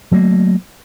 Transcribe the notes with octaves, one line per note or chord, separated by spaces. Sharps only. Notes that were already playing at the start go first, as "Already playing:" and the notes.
F#3 A3 A#3